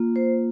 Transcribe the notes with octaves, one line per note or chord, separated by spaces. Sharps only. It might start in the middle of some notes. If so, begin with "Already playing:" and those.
Already playing: A#3 F4
C5